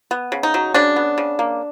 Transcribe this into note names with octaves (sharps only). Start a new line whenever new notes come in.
B3
C#3
D#4
F#3
C#3 D4
B3
C#3
A#3